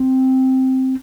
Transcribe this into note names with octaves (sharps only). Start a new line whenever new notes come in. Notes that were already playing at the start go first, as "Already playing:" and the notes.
Already playing: C4